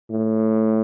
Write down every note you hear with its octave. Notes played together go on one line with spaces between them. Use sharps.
A2